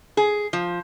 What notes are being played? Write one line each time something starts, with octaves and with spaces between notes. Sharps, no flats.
G#4
F3